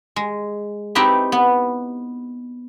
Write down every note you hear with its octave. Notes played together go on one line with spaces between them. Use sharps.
G#3
C4 D#4 E4 G4 B4
B3